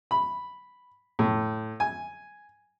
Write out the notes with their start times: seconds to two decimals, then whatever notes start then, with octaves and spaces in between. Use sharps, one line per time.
0.11 B5
1.19 A2
1.80 G#5